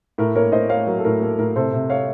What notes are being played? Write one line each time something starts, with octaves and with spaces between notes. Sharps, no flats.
A2 A#4
A#3 A#4 C#5
A2 C5 D#5
A#3 C#5 F5
F#3 A#4
A4
A2 A#4
A#3 A4
A2 A#4
C3 A4 C5
C3
C#5 F5